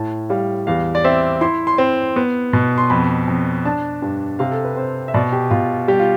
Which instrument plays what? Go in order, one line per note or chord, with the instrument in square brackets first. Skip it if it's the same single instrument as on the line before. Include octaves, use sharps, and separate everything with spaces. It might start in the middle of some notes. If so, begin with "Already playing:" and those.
Already playing: [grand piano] A2 A5
G3 F5
E2 F5
D5
C4 E5
E4 C6
C6
C4
B3
B2
C6
F2 B5
F2
D4 A5
G2
C3 F5
A4
B4
C4 C5
E5
B2 D5
G4
B2 F4
G3 G4
F4